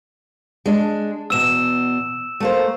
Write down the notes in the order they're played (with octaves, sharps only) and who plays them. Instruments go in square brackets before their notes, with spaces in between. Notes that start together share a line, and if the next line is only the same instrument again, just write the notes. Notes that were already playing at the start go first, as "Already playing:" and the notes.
[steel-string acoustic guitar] G#3 D4
[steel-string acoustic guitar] E2 B2 [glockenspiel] E6 E7
[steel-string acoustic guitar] A3 A#3 C5